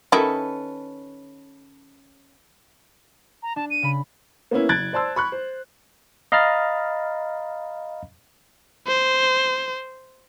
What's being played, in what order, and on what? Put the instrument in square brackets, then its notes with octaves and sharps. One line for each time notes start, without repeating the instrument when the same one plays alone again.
[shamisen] D#3 E4 [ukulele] C#4 A4 B4
[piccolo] A#5
[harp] D4 [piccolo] A5
[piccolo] D#7
[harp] C#3 B5
[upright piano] A#3 B3 C#4 E4
F#1 F#6 G#6 A6 D7
C5 D5 A5 C6 E6
B5 C#6 F#6
C5
[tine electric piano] D#5 F5 A#5 B5 F6 A6
[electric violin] C5